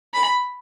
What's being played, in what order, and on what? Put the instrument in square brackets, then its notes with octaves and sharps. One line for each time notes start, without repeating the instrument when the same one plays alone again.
[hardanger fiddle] B5